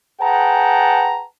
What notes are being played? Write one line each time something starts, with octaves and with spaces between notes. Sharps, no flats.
G#4 B4 F#5 G5 A5 A#5